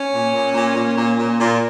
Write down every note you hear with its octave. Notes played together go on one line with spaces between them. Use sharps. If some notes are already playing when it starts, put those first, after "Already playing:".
Already playing: C#4
A#2
A#2
A#2
A#2
A#2
A#2
A#2